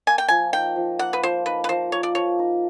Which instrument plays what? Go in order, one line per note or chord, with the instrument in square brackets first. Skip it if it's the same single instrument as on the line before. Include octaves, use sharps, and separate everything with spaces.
[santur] A#3 [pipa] G#5
[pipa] G5
[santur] F3 [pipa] G#5
[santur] D#4 [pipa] G5
[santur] F3
[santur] A#3 [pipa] F#5
[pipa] B4
[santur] F3 [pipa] C5
[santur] D#4 [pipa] B4
[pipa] B4
[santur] F3 [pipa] C5
[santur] A#3 [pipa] C#5
[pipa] D5
[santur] F3 [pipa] C#5
[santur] D#4